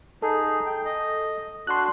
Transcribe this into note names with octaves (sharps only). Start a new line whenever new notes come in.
D#4 G#4 A4
G5
D#5
D4 F#4 C6 F#6